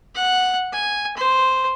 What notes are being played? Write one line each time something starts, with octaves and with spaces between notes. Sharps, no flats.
F#5
G#5
C5